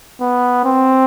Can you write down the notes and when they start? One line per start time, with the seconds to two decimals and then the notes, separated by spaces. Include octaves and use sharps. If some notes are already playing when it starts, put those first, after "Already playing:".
0.21 B3
0.65 C4